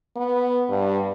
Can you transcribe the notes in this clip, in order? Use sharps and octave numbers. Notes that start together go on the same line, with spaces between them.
B3
G2